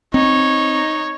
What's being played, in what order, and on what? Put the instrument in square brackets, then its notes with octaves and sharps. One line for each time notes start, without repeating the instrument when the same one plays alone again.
[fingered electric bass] C4 [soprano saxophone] D#4 [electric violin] C#5